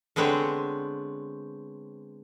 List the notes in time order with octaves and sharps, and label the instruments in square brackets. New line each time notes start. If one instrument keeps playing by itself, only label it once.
[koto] D3 G#3 B3 C4 C#5